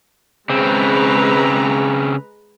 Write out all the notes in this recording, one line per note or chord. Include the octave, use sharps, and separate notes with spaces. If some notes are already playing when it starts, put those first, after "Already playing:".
C#3 G#3 C4 B4 A#5